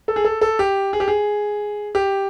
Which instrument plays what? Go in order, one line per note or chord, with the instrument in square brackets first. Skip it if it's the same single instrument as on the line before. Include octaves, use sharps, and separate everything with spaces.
[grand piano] A4
G#4
A4
A4
G4
G#4
G4
G#4
G4